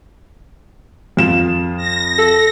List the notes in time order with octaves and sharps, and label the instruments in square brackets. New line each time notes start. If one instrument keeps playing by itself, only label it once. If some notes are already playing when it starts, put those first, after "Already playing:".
[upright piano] F2 F4 E7
[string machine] A#6
[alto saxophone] A4